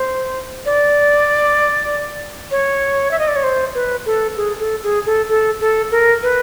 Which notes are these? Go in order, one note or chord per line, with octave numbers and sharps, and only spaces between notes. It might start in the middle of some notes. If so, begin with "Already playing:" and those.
Already playing: C5
D5
C#5
E5
D#5
D5
C#5
C5
B4
A4
G#4
A4
G#4
A4
A4
A4
A#4
B4